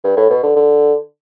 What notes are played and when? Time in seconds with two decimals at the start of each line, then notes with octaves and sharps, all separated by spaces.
0.04 G2
0.17 A2
0.30 B2
0.43 D3
0.56 D3